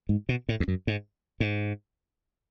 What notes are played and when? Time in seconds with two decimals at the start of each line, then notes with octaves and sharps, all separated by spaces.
0.09 G#2
0.29 B2
0.49 A2
0.60 E2
0.68 F#2
0.87 G#2
1.40 G#2